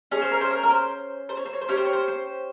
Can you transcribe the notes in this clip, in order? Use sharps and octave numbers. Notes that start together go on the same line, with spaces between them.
C#4 G#4
C5
A#4
C5
A#4
A#4
C5
C5
C#5
C5
C#5
C5
C#4 G4 C#5
C5
C#5
C5
C5